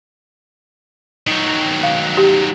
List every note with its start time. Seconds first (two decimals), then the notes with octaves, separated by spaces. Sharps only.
1.27 D#3 F#3
1.83 F5
2.17 G4